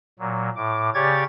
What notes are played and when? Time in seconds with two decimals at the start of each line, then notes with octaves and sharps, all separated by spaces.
0.19 A#2 F#3
0.56 A2 D6
0.94 C#3 G4 C#5 D5 G#6 A6